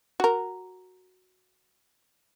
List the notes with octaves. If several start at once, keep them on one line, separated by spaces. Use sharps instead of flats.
F#4 A#4